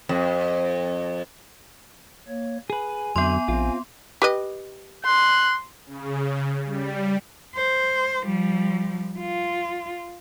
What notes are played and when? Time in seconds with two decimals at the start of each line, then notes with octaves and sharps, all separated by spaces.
0.09 F2
2.28 A#3 C#5
2.70 G#4 B4 G#5
3.16 F2 D3 F#3 B3 C6
3.48 A#1 C4 F4
4.22 G4 B4 D#5
5.05 C6 F#6
5.86 C#3
6.65 G3
7.55 C5
8.24 F3 G3
9.19 F4